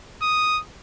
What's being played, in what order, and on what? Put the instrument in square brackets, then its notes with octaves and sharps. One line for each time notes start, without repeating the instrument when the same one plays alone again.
[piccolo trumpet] D#6